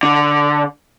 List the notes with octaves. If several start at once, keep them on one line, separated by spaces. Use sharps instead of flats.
D3